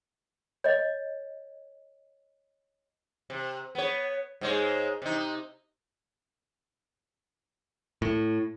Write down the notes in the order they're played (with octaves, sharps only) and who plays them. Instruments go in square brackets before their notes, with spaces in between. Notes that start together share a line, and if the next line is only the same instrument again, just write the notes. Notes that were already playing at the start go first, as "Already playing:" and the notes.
[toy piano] C#5 D#5
[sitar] C3
B3 C#5
G#2 G#3 C#5
C3 D#4
[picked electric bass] A2